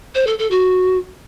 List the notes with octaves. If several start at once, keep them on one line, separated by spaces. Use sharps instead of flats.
C5
A4
A4
F#4